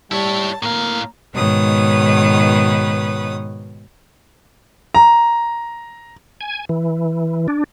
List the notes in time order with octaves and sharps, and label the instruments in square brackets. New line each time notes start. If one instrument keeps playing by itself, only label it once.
[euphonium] G3 [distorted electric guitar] E4 C#5 [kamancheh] A5
[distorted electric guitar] A2 F5 [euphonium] A#3 [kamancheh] A#5
[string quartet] G#2 B2 D#3 B4 C#5 D#6
[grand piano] A#5
[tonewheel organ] G#5
E3
D4